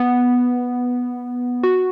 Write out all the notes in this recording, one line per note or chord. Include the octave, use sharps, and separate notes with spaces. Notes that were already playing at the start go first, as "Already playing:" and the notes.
Already playing: B3
F#4